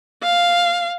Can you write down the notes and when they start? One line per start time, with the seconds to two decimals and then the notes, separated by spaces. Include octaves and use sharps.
0.23 F5